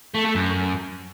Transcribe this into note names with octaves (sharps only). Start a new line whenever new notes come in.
A3
A3
F#2